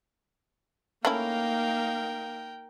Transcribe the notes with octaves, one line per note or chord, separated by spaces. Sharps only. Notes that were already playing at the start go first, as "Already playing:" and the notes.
A3 A#3 C#4 D#4 E4 A#4 F5 G5